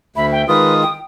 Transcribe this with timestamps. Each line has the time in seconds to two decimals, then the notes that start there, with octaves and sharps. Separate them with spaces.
0.16 D2 E5 B5
0.32 G5
0.48 D#3 G#3 F4 B4 D#6
0.82 G5